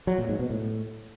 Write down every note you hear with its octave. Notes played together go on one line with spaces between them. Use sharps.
F#3
A#2
G#2
B2
A2